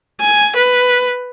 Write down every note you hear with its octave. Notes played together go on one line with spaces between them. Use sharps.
G#5
B4